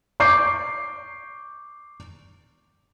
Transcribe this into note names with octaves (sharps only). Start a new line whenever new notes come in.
C#6 D6 G6 C7